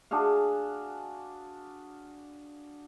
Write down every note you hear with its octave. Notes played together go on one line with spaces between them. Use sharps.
D4 F#4 G#4 F5